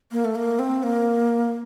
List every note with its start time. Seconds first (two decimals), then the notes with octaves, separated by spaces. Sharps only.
0.12 A#3
0.25 A3
0.35 A#3
0.59 C4
0.83 A#3